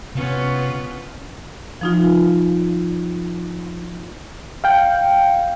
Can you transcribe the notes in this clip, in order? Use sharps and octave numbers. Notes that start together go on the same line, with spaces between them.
C3 B3 C#4 F4
F3 D#4 F4
F5 G5